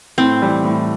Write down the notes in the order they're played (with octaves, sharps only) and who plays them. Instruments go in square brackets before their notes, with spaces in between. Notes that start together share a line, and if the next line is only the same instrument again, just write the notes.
[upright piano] A2 [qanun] C4
[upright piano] E3 G3
A2